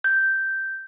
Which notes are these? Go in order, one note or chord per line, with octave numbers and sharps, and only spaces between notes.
G6